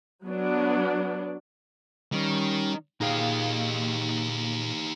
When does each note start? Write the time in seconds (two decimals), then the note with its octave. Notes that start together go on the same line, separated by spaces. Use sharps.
0.24 F#3 B3 D4
2.13 D#3 G3 C#4
3.01 A#2 D#4 G4 G#4 F5